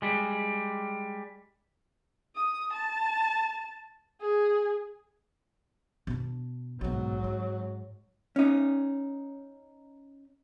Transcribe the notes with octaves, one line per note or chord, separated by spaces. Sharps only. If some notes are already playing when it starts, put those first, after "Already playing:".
G3 G#3
D#6
A5
G#4
B2 D4
B1 G#2 B2 F#3
C4
C#4 D#4